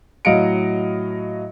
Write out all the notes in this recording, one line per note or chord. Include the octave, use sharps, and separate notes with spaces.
A2 F#3 D#5 F5 C#7 D7